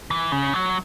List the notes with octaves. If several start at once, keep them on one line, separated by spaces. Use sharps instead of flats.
E3
C#3
F#3